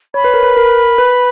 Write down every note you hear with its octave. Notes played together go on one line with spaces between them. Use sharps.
C#5 B5
B4
A#4
B4
A#4
B4